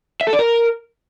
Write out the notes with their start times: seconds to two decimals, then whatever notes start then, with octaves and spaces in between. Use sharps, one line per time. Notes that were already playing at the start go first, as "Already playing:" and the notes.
0.21 E5
0.27 A4
0.33 D5
0.39 A#4